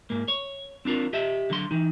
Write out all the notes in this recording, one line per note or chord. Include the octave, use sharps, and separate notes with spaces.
G#2 A#3
C#5
C4 D4 F4 A#4
G4 D#5 E5
D3 F#3 C6
E3 D#4